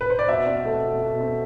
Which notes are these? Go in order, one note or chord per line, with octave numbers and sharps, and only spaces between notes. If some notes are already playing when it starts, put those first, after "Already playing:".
B4
C5
D5
B2 E5
C4
A3
B2
B2
C4